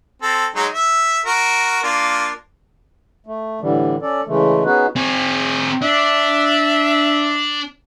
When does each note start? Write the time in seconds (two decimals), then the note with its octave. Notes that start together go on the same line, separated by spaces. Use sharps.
0.22 C4 A4
0.55 F#3 G#3 D#4
0.72 E5
1.26 F#4 A#4
1.83 A#3 D4 F4
3.26 A3
3.61 A2 D3 E3 G3
4.02 C#4 A4 D5
4.27 C#3 E3 G#3 A3
4.65 B3 C#4 D#4 F#4 G#4 B4
4.96 C4 G#4
5.82 D4 E5